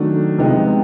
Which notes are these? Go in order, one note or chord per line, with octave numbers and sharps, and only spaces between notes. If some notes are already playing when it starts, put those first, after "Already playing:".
Already playing: D#3 F#3 A3 D4
C3 F3 G#3 B3 D#4